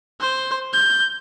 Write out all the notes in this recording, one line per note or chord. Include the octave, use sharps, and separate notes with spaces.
C5
G6